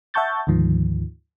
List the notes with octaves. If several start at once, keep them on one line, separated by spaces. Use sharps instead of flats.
E5 F#5 A5 C#6 G6 A6
D2 G#2 D#3 F3